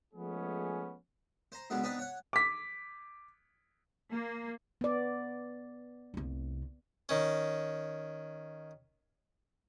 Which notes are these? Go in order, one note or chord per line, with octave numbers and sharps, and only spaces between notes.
F3 G#3 A3 B3 C#4 G#4
C5 A#5
C#2 B2 D3 F#3 B3
B3 C4 D4 D#4 B4
C#5 F#5
D6 B6
A#3
B3 D5
F1 C2
D#3 C#4